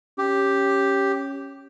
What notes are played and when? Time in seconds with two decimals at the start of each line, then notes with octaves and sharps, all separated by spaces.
0.18 C#4 G4